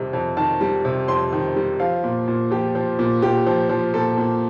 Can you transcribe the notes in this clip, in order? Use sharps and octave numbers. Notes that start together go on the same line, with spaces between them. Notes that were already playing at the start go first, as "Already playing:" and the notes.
Already playing: F2 C3 D#3 G3
F2
D#3 A5
G3
C3
F2 C6
D#3
G3
F3 F5
A#2
A#2
F3 G4
F3
A#2
A#2 G4
F3
F3
A#2 A4
A#2